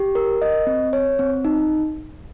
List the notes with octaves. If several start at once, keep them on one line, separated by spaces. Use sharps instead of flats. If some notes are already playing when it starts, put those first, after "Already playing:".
Already playing: G4
A#4
D#5
C4
C#5
C4
D#4